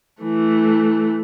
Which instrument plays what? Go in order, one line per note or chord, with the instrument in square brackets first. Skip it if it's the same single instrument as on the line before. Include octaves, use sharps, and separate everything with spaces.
[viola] E3 A3